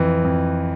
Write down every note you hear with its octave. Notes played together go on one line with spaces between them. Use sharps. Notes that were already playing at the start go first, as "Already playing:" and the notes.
Already playing: F2 E3
F2